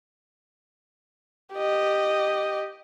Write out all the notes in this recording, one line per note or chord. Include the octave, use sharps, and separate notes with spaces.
G4 D#5